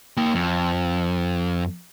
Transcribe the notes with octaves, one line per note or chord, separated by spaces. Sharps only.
A#3 G5
F2